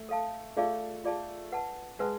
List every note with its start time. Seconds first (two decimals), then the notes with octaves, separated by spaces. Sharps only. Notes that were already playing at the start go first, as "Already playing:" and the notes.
Already playing: A3
0.09 A4 F5 A5
0.57 A3 F4 G#4 D5 F5 A5
1.04 F4 G#4 D5 F5 A5
1.52 B4 F#5 A5
1.99 G#3 B4 F#5 A5